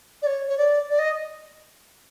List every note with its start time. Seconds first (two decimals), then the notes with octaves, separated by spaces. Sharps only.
0.22 D5
0.26 C#5
0.47 C#5
0.57 D5
0.89 D5
0.98 D#5